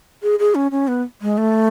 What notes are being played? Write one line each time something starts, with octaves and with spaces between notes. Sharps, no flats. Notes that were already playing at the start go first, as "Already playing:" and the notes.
G#4
G#4
C#4
C#4
B3
G#3
A3